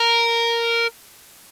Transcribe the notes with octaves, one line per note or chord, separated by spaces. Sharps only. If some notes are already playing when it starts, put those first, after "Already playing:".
Already playing: A#4